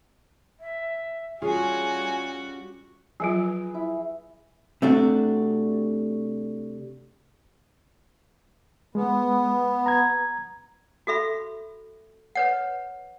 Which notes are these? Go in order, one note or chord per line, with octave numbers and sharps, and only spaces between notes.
E5
G3 C#4 F4 F#4 G#4 G#5
F3 F#3 F4 G#4 B4
E4
C3 A3 D4 F#4
G#3 B3
A#5 G#6
F#4 A4 E5 B5
B4 C#5 F#5